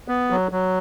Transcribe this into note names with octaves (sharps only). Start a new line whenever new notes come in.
B3
F#3
F#3